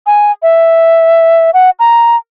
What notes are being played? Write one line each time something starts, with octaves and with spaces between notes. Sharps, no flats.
G#5
E5
F#5
A#5